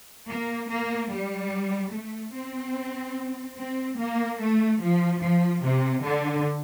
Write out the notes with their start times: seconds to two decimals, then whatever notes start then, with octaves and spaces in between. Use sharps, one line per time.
0.29 A#3
0.70 A#3
1.11 G3
1.93 A3
2.34 C4
3.58 C4
3.99 A#3
4.40 A3
4.81 F3
5.21 F3
5.62 C3
6.04 D3